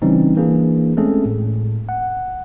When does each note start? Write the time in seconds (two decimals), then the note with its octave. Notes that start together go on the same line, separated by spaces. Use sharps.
0.02 C#3 E3 G3 C4 C#4 D#4
0.37 E3 A#3 D4 G#4
0.97 G#3 A3 C4 C#4 G#4 A4
1.26 A2
1.89 F#5